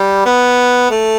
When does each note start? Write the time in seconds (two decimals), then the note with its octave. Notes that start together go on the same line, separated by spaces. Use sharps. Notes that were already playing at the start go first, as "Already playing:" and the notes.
Already playing: G3
0.26 B3
0.91 A3